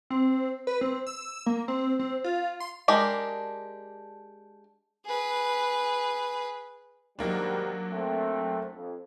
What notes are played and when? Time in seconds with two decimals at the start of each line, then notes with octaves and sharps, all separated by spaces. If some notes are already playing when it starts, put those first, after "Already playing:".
0.10 C4
0.67 B4
0.81 C4
1.07 E6
1.47 A#3
1.68 C4
1.99 C4
2.24 F4
2.60 C6
2.88 G#3 D4 G4 A#4
5.05 G#4 B4
7.19 G#2 D#3 F#3 G3 A#3 D4
7.91 A3 C4
8.75 F2